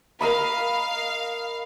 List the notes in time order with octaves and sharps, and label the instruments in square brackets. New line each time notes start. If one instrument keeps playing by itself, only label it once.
[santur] A#4 D#5 B5 [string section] F5